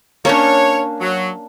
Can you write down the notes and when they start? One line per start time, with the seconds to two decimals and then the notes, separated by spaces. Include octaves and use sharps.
0.25 A#3 C#4 D4 C#5
1.00 F#3